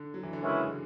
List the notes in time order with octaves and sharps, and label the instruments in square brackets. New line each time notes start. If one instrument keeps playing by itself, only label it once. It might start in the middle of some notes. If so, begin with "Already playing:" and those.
Already playing: [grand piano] D3
F#3
E3
D3
[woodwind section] F#2 E3 G#3 C#4 E4 [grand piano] C#3